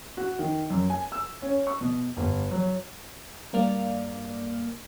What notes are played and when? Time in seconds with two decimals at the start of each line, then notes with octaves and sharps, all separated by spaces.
0.17 F#4
0.39 D#3
0.70 F#2
0.90 G#5
1.12 E6
1.42 C#4
1.67 C#6
1.81 B2
2.17 G1
2.51 F#3
3.53 G2 A#3 D5 F6